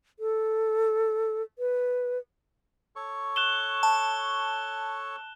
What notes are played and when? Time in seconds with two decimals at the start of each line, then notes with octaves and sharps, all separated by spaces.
0.19 A4
1.59 B4
2.96 A4 C#5 C#6
3.36 F#6 E7 G7
3.83 A5